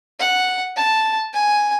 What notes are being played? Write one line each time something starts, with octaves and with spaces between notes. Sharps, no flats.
F#5
A5
G#5